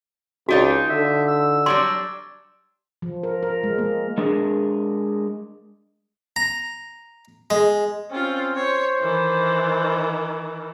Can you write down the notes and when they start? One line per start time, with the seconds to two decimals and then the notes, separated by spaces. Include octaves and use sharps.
0.49 C#2 D4 D#4 F4 F#4
0.89 D3 E5
1.28 E6
1.66 F#3 G3 D4 C6
3.02 F3
3.23 A#4
3.43 A#4
3.63 G#3
3.78 A#3
4.18 G#3 D4 G#4 A#4
6.36 A#5
7.50 G#3
8.11 C4 C#4 F4
8.56 C5 C#5
9.01 D#3 E3